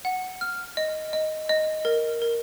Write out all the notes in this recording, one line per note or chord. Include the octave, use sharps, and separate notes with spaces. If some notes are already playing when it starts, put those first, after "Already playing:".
F#5
F6
D#5
D#5
D#5
A#4
A#4